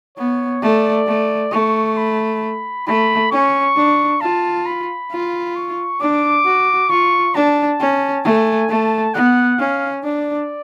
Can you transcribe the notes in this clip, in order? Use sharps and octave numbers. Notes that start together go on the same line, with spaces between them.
B3 C#5
A3 D5
A3
A3 C#6
B5
A3 B5
C#4 C#6
D4
F4 A5
B5
F4
C#6
D4 D6
F#4
F4 C#6
D4 A5
C#4
A3 G#5
A3 A5
B3 F#5
C#4 F5
D4 D5